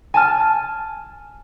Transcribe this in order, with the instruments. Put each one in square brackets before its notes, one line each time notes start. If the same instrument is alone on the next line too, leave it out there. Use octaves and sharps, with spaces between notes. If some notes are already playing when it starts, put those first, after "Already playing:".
[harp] G#5 A5 F6